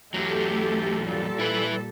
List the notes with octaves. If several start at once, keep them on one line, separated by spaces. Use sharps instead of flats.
E2 F#3 A3 G4 A4
A#2 G3 A4
E4 B4